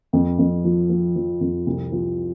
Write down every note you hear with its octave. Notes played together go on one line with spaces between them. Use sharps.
F2
F2
F3
F3
F3
F2
C2
F3